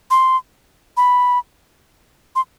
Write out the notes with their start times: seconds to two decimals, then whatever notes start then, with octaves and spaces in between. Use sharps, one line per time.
0.11 C6
0.97 B5
2.36 C6